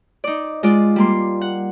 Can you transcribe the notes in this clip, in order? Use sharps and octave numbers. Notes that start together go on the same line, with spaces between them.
D#4 D5
G#3 F4 D5
G3 A#3 C6
F#5